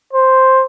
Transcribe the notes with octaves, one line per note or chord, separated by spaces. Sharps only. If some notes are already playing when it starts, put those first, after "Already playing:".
C5